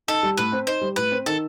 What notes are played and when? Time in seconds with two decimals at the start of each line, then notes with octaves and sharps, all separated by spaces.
0.08 D#4 A4
0.23 G3
0.37 A2 B4
0.52 C4
0.67 D#4 C5
0.81 G3
0.96 A2 B4
1.12 C4
1.26 D#3 A4